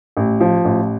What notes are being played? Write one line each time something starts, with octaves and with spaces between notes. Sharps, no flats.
A1
F3
A1